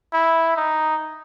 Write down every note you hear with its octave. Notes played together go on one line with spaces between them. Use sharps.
E4
D#4